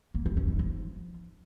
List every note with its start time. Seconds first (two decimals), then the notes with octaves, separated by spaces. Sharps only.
0.14 A#3
0.26 E4
0.37 C#4
0.48 D#4
0.59 F3